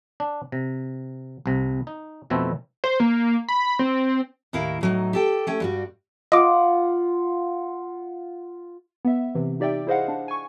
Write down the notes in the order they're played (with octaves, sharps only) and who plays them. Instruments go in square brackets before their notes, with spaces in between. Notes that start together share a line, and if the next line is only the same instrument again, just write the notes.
[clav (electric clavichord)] D4
C3
C2 C3
D#4
F2 B2 A3 C4 E4
[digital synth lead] C5
A#3
B5
C4
[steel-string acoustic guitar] D#2 A2 E4 A#4 F5 A#5
A2 F#3 D#4
G4 A4 G5
A3 C#4 G5
G2 G3 F#4
[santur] F4 F#5 [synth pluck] D#5 D6
[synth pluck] B3 E5
C3 E3
D#4 G4 D5 E5 G5
E4 G#4 C5 D#5 F5 F#5
D4
G#5 C#6